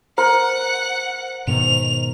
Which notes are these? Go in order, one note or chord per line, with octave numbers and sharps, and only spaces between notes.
A#4 C5 F#5
G#2 B2 D#3 F7